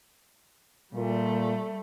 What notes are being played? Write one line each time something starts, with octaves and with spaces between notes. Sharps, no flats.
A#2 G3 A3